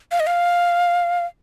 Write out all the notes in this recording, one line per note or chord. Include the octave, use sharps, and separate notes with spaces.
F5
D#5
F5